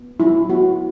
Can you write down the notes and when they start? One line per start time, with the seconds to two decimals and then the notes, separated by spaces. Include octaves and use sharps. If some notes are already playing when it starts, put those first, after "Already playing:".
Already playing: B3
0.20 F#3 E4
0.50 B3 F#4